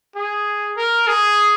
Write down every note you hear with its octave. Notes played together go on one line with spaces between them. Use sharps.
G#4
A#4
G#4